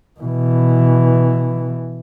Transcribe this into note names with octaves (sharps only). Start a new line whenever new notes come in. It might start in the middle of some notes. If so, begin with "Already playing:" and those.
B2 E3